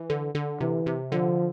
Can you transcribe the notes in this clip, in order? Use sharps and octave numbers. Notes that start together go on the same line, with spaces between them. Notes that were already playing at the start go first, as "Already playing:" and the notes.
Already playing: E3
D3
D3
C3 E3
C3
D3 F3